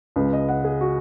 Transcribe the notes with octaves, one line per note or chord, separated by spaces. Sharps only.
C#2 C#3 G#3 B4
D#5
F#5
G#4
F#4